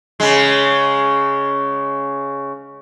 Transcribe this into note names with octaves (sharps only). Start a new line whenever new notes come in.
C#3 G#3